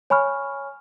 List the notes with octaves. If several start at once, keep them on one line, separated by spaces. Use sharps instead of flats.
C#5 G#5 B5 C#6 F6